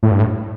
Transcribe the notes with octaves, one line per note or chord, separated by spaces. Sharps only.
A2
G2
A2